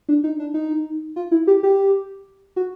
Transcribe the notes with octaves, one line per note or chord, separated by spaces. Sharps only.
D4
D#4
D4
D#4
F4
E4
G4
G4
F#4